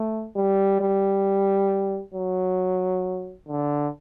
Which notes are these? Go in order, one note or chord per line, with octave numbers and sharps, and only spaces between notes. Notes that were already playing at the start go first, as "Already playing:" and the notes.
Already playing: A3
G3
G3
F#3
D3